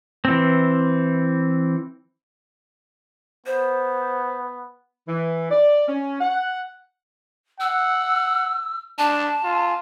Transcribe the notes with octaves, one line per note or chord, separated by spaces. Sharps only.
E3 C4
B3 C5
E3
D5
C#4
F#5
F#5 E6
D4 A5
F4